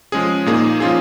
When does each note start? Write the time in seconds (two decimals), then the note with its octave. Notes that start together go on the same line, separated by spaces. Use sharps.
0.12 F3 G#3 C#4 G#4
0.46 A#2 A#3 D#4 G#4
0.80 F3 C#4 F4 G#4